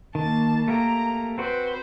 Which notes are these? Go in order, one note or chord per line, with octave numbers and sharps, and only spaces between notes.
D#3 A#3 A5
A3 A#3 G4 A#5
C4 F#4 B4 C5